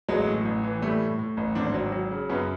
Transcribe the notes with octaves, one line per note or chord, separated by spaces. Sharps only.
A1 F#3 G#3
A2
A1
E3
A2 G3 A3
A2
A2
A1
G#1 C4 D4
F#3
F#3
C#3
F#2 B3 C#4